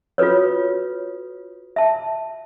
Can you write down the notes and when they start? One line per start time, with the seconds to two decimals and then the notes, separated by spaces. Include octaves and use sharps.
0.18 F4 F#4 A4 B4 C#5
1.76 E5 A5